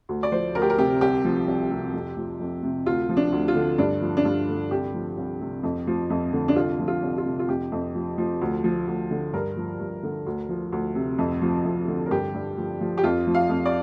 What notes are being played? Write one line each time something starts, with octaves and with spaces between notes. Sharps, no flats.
D2
D5
F3 C5
D2 A#4
G4
A#4
C3 G4
C2 G4
F3
C2
C3
F2
F3
F2
C3
D2 F4
F3
D4
D2
F4
D3
G2 D4
F3
D4
G2 F4
D3
C2 G4
F3
C2
C3
F2
F3
F2
D3
D4
C2 F4
F3
F4
C2
F4
C3
F4
F2 G4
F2
F3
F3
D2
F3
D2
D3
G2 A#4
F3
G2
D3
D2
F3
D2
C3
F2
F3
F2
D3
A#4
G2 G4
G2
F3
F3
G4
F2 F4
F3
F5
F2
D5